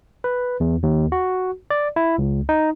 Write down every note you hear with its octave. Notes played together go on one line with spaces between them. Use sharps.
B4
E2
D#2
F#4
D5
E4
C#2
D#4